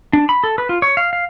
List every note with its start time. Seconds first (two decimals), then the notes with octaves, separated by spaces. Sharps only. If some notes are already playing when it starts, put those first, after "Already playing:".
0.13 D4
0.29 B5
0.44 A4
0.58 B4
0.69 F4
0.82 C#5
0.97 F5
1.13 F5